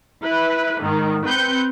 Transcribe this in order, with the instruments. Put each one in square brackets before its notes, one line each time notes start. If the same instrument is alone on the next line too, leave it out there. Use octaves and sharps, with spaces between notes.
[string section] E4 B4
G#2 D#3
C4 B4 G6 C#7